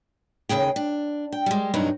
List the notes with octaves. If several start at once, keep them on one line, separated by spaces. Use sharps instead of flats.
D#2 G#2 C#3 G#4 G5
D4
G5
G3 G#3
G2 C3 E3 F#3 D#4 E4